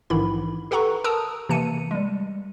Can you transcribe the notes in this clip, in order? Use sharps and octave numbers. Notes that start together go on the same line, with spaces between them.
A#1 G#2 D#3 E3 E4 B5
G4 A4 B4 F#5 A#5 C#6
A#4 A5 A#5 D#6 E6
C3 E3 A#3 A5 C#7 D#7
G3 G#3